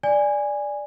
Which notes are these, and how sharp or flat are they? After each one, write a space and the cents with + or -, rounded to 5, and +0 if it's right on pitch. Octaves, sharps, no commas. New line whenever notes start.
D5 +0 G#5 -10